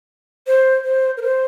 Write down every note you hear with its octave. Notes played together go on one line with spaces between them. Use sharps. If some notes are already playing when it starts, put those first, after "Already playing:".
C5
C5
A#4
C5